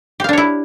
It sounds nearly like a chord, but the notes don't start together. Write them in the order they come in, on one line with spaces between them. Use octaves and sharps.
G4 F5 D4 C#5 E4